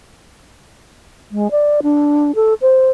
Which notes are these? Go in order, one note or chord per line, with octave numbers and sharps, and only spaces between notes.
G#3
D5
D4
A4
C5